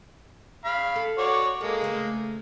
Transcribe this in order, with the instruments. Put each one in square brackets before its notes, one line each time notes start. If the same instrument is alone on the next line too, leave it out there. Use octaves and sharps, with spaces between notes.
[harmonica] F5 B5
[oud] A4
[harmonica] F#4 C#5 D5
[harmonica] G#3 A#3 [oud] A4
[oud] C#3 A3 C5